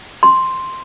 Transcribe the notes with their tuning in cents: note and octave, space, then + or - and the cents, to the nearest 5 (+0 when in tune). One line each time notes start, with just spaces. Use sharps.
C6 +0